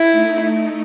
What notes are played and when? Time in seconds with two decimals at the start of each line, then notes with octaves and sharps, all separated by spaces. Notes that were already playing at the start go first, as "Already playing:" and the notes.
Already playing: E4
0.12 A3 D#4